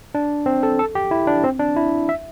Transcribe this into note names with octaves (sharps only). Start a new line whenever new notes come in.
D4
C4
A4
A4
G4
E4
D4
C4
D4
E4
E5